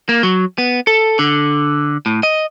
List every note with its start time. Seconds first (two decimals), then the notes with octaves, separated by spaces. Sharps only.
0.09 A#3
0.23 F#3
0.58 B3
0.87 A4
1.19 D3
2.06 A2
2.23 D#5